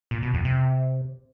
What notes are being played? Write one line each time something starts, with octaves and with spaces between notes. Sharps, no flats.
A#2
B2
F2
C3